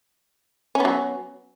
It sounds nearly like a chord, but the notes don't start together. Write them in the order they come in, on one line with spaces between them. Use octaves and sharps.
C#4 B3 F#3